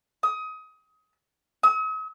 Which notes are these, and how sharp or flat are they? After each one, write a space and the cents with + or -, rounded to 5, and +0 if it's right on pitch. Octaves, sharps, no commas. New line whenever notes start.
D#6 +25
D#6 +45